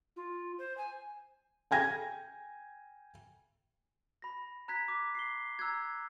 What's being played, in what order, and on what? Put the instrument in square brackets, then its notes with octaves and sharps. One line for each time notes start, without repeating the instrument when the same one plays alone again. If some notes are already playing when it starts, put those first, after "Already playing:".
[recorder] F4
C5
G#5
[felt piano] G5 G#5 G#6 A#6
[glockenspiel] B5 A#6
A#5 F#6 G#6 B6
D6
C7 G7
A#5 E6 F#6 G#6